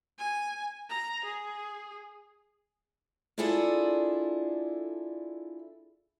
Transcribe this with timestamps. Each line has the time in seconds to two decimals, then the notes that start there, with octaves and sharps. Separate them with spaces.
0.18 G#5
0.89 A#5
1.24 G#4
3.38 D4 E4 F4 G#4 A4 D5